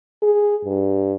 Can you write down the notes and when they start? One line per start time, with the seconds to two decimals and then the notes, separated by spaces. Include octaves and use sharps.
0.22 G#4
0.65 G2